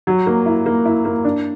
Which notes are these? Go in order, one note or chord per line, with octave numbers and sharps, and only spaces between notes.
F#3
A#3
E4
A#3
E4
A#3
D4